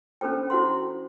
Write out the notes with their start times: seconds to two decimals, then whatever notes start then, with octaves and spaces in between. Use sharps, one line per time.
0.21 C#4 D4 A4 C5 G5
0.50 E4 F#4 C5 F#5 C6